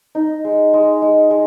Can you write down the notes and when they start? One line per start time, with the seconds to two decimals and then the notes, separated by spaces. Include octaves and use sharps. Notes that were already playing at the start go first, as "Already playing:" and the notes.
0.15 D#4
0.45 G#3
0.74 G#3
1.02 G#3
1.31 G#3